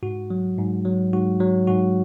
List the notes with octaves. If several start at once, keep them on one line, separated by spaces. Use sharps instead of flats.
G#2 F#4
F#3
G#2
F#3
G#2 F#4
F#3
G#2 F#4